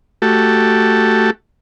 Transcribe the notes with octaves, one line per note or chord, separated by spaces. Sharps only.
A3 F#4 G4 A4